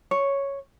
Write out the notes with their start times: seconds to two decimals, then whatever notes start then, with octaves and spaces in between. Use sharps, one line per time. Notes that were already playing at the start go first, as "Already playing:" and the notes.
0.11 C#5